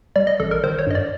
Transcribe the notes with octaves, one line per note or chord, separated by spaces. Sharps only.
G3 D5
D#5
A1 A4
A#4
D#3 C5
C#5
G2 D#5
D5